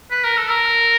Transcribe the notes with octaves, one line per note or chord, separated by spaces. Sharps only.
B4
A#4
A4
A#4